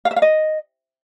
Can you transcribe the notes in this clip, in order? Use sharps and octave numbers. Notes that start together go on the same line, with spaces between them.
F5
E5
F5
D#5